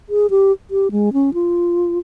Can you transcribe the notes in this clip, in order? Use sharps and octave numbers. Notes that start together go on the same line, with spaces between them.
G#4
G4
G4
G#3
C#4
F4